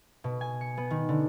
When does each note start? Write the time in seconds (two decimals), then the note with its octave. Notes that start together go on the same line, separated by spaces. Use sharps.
0.24 B2
0.41 G#5
0.61 C#7
0.77 B3
0.90 D#3
1.09 D3